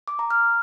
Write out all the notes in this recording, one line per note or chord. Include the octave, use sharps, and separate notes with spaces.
D6
A#5
F6